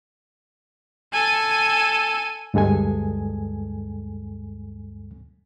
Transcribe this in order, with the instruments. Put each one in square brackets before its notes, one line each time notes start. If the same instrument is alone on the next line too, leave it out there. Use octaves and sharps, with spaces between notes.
[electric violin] A4 G#5
[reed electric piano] D2 G2 G#3 A4 G#5